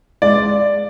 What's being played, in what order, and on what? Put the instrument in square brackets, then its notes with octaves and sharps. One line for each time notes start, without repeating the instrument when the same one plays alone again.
[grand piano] G#3 D5